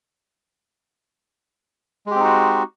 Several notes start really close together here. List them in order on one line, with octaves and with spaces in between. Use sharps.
G#3 G4 C4 D#4 F#4